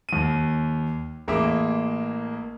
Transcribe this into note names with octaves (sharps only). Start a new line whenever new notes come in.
D#2 D#7
A1 A#3 G#4 E5 D6